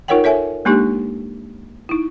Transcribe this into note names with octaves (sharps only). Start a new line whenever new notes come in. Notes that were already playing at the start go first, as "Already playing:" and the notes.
D#4 F4 A#4 C#5 F#5 G5
A4 C#5 E5 G#5
G#3 A#3 D4 D#4 G4
D#4 E4